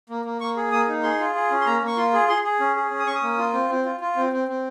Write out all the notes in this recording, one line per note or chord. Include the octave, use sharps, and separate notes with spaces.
A#3
A#3
A#3 C#6
G#4
A#3 D#6
D#4
G#4 C6
F4
G#4
C#4
C6
A#3 A#5
A#3 C#6
F4 C6
G#4
G#4 C6
G#4
C#4
G#4
C#4
D#6
C#4 C#6
D#6
A#3
F4
C4
C4
F4
F4
C4
C4
C4